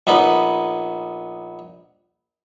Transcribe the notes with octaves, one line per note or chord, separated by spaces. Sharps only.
A#1 B3 D#4 B5